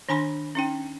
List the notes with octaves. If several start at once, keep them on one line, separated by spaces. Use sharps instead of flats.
D#3 D4 G#5 B5 C6
C#4 D#4 G5